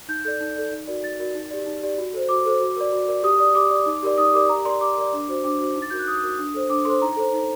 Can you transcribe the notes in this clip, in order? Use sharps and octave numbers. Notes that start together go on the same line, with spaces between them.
D#4 G6
A4 D5 G6
D#4
A4 D5
D#4
F#4 A#4 D5
D#4 A6
F#4 A#4 D5
D#4
G4 D5
D#4
G4 D5
F#4
A4 C5
F#4 D6
A4 C5
F#4
A#4 D5
F#4
A#4 D5
G4 D#6
D5 D#6
G4 D6
D5
D#4
G4 A#4 D5
D#4 D#6
G4 A#4 D5 D6
G4 A#5
A#4 D5 C6
G4 D6
A#4 D5
D4
F#4 C5
D4 D6
F#4 C5
D#4
A6
F#4 A#4 G6
F#6
D#4 D#6
F#4 A#4
D4
A4 C5
D4 D6
A4 C5 C6
D#4 A#5
A4 C5
D#4